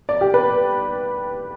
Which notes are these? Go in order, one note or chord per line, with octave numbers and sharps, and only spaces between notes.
D5
G4
B4